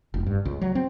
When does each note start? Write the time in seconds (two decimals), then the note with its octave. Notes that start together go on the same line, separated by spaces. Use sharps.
0.14 F1
0.27 G2
0.45 C#2
0.61 F#3
0.75 C4